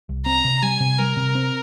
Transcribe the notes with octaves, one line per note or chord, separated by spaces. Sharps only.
C2
C4 A#5
C3
G3 G#5
C3
G3 A#4
C3
C4